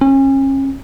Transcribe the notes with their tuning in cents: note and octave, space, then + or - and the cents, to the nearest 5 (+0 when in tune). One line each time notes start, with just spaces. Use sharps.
C#4 -35